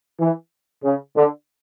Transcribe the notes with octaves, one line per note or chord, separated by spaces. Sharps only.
E3
C#3
D3